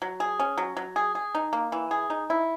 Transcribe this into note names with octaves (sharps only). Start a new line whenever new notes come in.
F#3
G#4
C#4
F#3
F#3
G#4
G#4
D#4
A#3
E3
G#4
D#4
E4